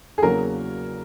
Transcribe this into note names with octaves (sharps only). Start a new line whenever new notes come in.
G#4
E2 C#3 F#3 A#3 F#4 A#4